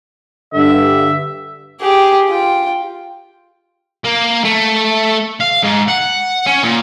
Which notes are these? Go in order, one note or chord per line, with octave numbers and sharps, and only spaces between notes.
G2 D3 E5
G4 G#4
F4 G5
A#3
A3
F5
G#2
F#5
C#4
A#2